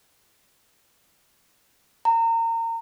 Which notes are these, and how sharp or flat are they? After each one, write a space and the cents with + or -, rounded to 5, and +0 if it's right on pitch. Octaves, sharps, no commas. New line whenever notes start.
A#5 -30